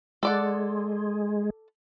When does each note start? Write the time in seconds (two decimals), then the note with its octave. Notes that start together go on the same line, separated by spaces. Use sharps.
0.23 G#3 A4 D5 F#5